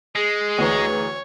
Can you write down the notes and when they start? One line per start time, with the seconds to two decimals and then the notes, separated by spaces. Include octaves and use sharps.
0.15 G#3 G#4
0.58 D2 E3 C#5 A#5